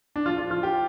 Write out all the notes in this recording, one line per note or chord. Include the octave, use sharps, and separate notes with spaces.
D4
F3 F4
F4
F3 F4
G4